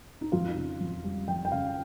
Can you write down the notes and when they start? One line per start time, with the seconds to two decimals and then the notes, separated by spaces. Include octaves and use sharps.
0.21 D#4
0.32 F2 F4
0.56 C#3
0.80 F2
1.04 G3
1.28 F2 G5
1.45 G5
1.52 C#3 F5